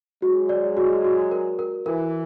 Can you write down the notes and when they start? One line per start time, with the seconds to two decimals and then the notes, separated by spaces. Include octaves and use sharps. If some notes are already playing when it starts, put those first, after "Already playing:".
0.22 F#3 G#3 F#4
0.49 D5
0.77 F#4
1.04 F#4
1.31 A#4
1.59 A#4
1.86 E3 A#4